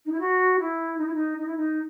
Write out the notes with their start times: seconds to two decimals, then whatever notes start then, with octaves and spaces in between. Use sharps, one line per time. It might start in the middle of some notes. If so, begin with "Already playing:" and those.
0.05 D#4
0.11 E4
0.19 F#4
0.59 E4
0.97 D#4
1.05 E4
1.13 D#4
1.37 D#4
1.46 E4
1.56 D#4